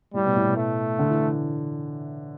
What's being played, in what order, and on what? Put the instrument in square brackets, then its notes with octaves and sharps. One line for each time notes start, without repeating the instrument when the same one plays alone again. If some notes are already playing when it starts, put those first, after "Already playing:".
[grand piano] A2 [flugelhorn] G3
[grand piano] B2
A2
B2
[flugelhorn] A3
[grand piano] D3
E3